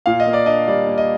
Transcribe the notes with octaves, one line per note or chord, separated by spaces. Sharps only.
A#2 F5
D#5
A#3
D5
D4 D#5
G3 D5
A#3
D#5